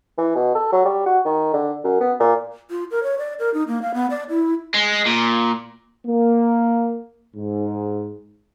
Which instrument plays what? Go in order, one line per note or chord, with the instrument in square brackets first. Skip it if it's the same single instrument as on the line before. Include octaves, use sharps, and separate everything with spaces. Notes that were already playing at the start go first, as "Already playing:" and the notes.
[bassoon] E3
B2
A4
F#3
G3
F#4
D#3
D3
F#2
B3
A#2
[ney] F4
A#4
C#5
D5
A#4
D#4
A#3
F5
B3
D5
E4
[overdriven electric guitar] G#3
A#2
[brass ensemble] A#3
G#2